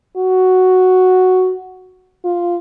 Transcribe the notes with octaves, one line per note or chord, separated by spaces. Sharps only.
F#4
F4